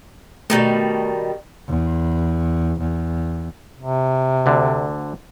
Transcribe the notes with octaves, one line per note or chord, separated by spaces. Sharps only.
B2 D#3 G3 A3
E2
E2
C3
D2 D3